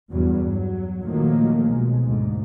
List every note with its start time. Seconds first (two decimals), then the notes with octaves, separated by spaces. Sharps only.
0.10 E2 G2 F#3
0.46 F#3
1.03 A#2 D#3 F3 F#3 A3 A#3
1.67 B1 G#3
2.04 D2 G#2